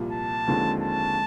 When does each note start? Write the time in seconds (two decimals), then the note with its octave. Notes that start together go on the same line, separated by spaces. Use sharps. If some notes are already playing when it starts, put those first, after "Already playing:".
Already playing: C2 A#2 F3
0.12 A5
0.47 D#2 D3 F3 G#3 C4
0.82 A5